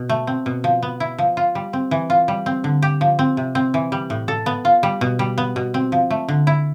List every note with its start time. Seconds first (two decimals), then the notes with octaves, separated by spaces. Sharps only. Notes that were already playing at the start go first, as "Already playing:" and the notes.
Already playing: B2
0.09 A3
0.27 C4
0.46 B2
0.64 F3
0.83 B3
1.00 E4
1.18 F3
1.37 F4
1.55 G3
1.73 C4
1.91 E3
2.10 F4
2.28 G3
2.46 C4
2.64 D3
2.82 G4
3.01 F3
3.19 C4
3.37 C3
3.55 C4
3.74 E3
3.92 G3
4.10 A2
4.28 A4
4.46 B3
4.65 F4
4.83 G3
5.01 B2
5.19 G3
5.38 B3
5.56 B2
5.74 C4
5.92 F3
6.10 A3
6.28 D3
6.47 E4